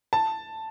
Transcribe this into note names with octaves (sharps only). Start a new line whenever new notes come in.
A5